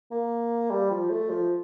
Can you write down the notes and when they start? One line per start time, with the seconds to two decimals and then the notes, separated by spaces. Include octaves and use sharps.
0.11 A#3
0.71 G3
0.91 F3
1.10 A3
1.30 F3